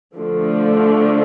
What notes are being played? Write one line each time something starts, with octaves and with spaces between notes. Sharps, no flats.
D3 F3 A3 D4